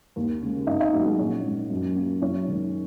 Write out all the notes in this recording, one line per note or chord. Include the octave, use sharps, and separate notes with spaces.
D#2
C#3 G#3
G#1 D#4 D#5
D#4 D#5
G#2 F#3 A#3 F#4
G#3 G#4
A#1 C#4 C#5
G#2 G#3
F#2
F#3 A#3
F#2 C#4 C#5
D#3 G#3